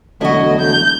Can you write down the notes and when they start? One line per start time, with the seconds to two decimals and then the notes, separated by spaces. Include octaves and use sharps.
0.21 E1 D3 F#3 A3 E4 F#4 D#5
0.61 G6